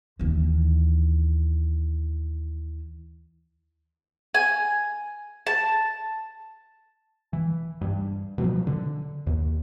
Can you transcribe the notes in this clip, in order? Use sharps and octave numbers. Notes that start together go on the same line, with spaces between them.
D#2 E3
G#5
A5
E3
G2
B2 F3 F#3
D3
D#2